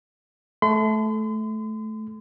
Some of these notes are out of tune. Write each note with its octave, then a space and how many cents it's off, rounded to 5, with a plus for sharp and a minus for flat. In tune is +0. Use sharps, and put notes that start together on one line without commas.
A3 -20 C6 -40